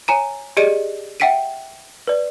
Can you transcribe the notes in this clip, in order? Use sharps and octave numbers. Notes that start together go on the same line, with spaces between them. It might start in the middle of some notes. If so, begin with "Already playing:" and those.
C#5 G#5 A#5 D#7
G4 G#4 D5 D#5 C#7 D#7
E5 F#5 G5 B6 D7 D#7
B4 D5